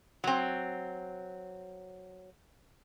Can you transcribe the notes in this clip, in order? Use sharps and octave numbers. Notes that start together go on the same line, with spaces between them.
F#3 C4